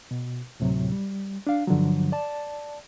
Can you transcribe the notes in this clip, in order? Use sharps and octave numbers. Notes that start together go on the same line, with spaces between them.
B2
D2 A2 C3 F#3
G3
D4 F5
G2 D3 F3 F#3
D5 A5